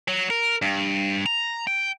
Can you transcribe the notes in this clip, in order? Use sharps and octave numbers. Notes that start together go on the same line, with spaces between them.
F#3
A#4
G2
A#5
G5